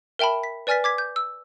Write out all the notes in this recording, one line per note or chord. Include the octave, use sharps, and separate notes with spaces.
A#4 E5 G5 A5 B5
B6
B4 D5 G#5 F6 A6 B6
D6 G#6 B6
G6
E6